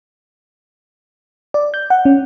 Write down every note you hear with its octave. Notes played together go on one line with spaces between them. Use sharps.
D5
G6
F#5
C#4